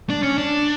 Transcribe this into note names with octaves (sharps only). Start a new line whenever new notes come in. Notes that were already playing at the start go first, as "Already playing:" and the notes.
D4
C#4
D4